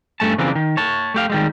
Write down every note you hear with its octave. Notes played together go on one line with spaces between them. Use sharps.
G2 E3 A3 C#4 A5
C#3 E3 F3 A#3 C4 D4
D#3
C#5 A5
A3 G4 F5
D#3 G3 G#3